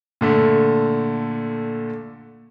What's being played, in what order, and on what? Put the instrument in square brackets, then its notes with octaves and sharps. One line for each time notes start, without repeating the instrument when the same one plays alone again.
[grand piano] A#2 D3 A3